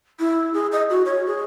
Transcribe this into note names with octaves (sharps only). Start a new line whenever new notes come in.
E4
G#4
D#5
F#4
C#5
G#4